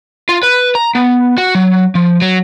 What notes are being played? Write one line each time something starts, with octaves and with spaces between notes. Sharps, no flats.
F4
B4
A#5
B3
F#4
F#3
F3
F#3